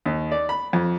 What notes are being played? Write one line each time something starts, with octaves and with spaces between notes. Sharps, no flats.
D#2
D5
B5
F2